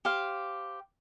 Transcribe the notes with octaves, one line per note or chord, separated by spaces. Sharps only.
G4 C5 F5